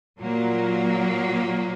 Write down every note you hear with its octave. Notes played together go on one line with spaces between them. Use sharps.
A#2 F#3 A#3